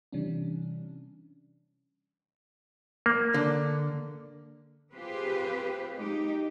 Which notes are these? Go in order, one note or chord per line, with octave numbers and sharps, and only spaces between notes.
C3 E3 G3 C#4 D4
A#3
D3
C4 F4 G4 G#4 B4 C5
G#3 A#3 D#4 G4